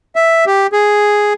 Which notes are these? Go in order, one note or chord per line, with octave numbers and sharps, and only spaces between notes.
E5
G4
G#4